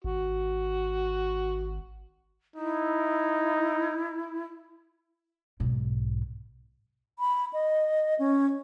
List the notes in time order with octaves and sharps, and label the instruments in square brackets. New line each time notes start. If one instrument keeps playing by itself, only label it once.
[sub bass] G#1 [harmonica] F#4
[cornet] D#4 [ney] E4
[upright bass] B1 G#2
[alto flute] B5
D#5
C#4